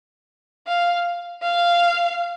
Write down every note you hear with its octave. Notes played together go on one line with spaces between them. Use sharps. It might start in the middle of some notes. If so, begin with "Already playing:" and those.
F5
F5